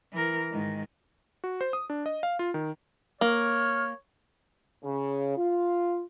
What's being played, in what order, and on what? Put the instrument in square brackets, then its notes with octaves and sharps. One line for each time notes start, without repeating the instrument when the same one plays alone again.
[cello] E3 A#4
G#2 D#3
[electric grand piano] F#4
C5
D#6
D4
D#5
F5
F4
D#3
[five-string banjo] A#3 [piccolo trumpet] C#5 [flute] F6
[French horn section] C#3
F4